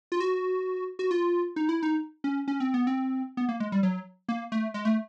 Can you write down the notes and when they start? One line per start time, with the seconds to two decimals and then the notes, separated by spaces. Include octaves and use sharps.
0.12 F4
0.20 F#4
0.99 F#4
1.11 F4
1.56 D#4
1.69 E4
1.83 D#4
2.24 C#4
2.48 C#4
2.60 C4
2.74 B3
2.87 C4
3.37 B3
3.49 A#3
3.60 G#3
3.72 G3
3.83 F#3
4.29 A#3
4.52 A3
4.74 G#3
4.85 A3